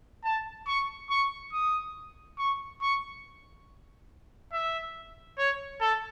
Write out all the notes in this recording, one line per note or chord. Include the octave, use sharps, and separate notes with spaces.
A5
C#6
C#6
D#6
C#6
C#6
E5
C#5
A4